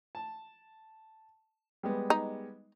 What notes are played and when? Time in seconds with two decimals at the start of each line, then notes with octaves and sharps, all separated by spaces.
0.15 A5
1.83 G3 G#3 B3
2.10 D#4